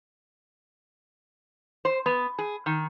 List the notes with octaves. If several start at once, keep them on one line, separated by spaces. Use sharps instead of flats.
C5
B3
G#4
D#3